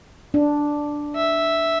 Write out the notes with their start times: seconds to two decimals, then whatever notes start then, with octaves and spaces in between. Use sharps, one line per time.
0.34 D4
1.16 E5